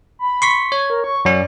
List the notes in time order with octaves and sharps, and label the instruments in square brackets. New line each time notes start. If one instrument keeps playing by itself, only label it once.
[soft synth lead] B5
[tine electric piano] C6 C#6 B6
[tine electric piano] C#5 [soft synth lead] G#6
[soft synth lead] A#4
C#6
[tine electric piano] F#2 C#4 [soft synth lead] D5